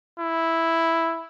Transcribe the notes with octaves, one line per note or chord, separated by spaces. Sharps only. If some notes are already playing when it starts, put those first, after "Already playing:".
E4